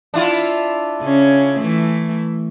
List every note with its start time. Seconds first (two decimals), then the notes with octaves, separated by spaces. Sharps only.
0.14 D4 E4 F4
1.02 C#3 C#4
1.60 E3 A3